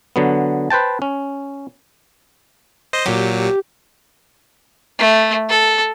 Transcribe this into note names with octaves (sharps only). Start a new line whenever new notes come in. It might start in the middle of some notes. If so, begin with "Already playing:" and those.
D3 F#3 B3
B4 C5 G5 A5
C#4
C5 D#5
A#2 F#3 G4
A3
A4